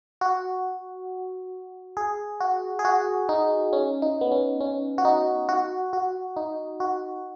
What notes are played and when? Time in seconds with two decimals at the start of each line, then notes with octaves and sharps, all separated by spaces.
0.21 F#4
1.97 G#4
2.40 F#4
2.79 G#4
2.85 F#4
3.29 D#4
3.73 C#4
4.02 D#4
4.21 B3
4.32 C#4
4.61 C#4
4.98 F#4
5.05 D#4
5.49 F#4
5.93 F#4
6.37 D#4
6.80 F#4